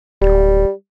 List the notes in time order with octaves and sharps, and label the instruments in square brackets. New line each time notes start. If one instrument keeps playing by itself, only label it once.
[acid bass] D1 [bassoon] G3